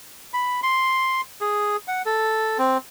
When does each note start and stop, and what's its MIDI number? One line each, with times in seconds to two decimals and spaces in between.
0.34 0.60 83
0.63 1.21 84
1.41 1.76 68
1.88 2.02 78
2.06 2.58 69
2.59 2.78 60